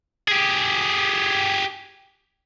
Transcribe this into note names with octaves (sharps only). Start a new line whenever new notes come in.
G4 G#4